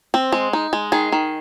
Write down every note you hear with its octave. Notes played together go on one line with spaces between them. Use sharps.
C4
G#3
D#4
G#3
D#3 G#4
D#3